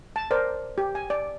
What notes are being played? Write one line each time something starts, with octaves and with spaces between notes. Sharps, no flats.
A5
A#4 C5 D5
G4
G#5
D5